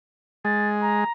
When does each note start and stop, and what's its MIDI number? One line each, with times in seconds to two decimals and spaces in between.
0.45 1.04 56
0.45 0.68 93
0.81 1.12 82